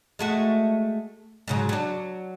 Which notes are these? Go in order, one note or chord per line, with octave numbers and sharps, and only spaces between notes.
G#3 A3 F#4
G#2 C#3 F#3
F#3 D4